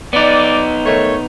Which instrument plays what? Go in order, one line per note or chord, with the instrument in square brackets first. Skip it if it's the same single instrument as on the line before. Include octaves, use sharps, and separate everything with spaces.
[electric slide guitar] B3 D#4 [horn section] D5
[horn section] D#3 A3 C#5